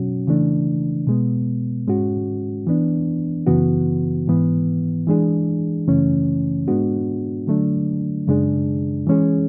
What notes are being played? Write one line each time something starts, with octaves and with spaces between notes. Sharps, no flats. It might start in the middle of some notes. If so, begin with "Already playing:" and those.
Already playing: B2 F#3 C#4 F#4
C#3 E3 A3 D4
B2 G#3 B3
G#2 G#3 C#4 F#4
E3 B3 D4
F#2 C#3 E3 B3 F#4
G#2 E3 B3
E3 G#3 D4 G#4
F#2 C#3 E3 A3 C#4
G#2 G#3 B3 D4 F#4
D3 F#3 A3 D4
F#2 C#3 G#3 D4 G#4
E3 G#3 C#4 G#4